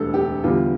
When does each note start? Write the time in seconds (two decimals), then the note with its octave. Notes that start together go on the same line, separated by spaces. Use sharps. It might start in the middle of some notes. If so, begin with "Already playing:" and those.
Already playing: E1 D2 D3 G3 A4
0.14 G4
0.44 E2 D3 G3 F4